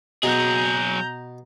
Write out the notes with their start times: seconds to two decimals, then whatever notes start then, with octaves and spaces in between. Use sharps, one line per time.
0.23 B2 F#3 G#4 A#5 G6